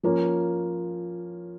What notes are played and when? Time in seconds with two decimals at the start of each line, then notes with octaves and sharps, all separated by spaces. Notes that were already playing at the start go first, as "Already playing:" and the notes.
0.03 F3 A#3 C#4